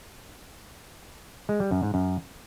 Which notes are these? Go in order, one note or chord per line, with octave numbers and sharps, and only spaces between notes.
G#3
G3
F#2
G#2
F#2